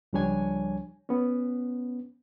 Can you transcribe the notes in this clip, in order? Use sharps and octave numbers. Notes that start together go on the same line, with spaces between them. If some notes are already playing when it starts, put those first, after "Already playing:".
C#2 F3 G3 D4 C#5 G#5
B3 C#4